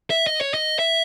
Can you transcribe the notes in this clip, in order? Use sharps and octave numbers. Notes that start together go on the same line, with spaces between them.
E5
D#5
C#5
D#5
E5